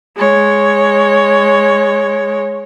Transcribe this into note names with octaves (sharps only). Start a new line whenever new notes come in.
G#3 C#5